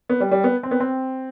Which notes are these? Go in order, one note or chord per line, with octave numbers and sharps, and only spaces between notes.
B3
G3
G3
B3
C4
B3
C4